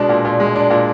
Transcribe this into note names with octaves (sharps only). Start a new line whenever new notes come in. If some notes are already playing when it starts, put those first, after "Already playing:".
Already playing: B2 G#3 D4
A#2
A#2
G#3
D4
A#2